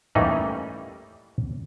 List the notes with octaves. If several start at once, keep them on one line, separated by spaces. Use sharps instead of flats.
E3 G3 A3 A#3 C#4 D#4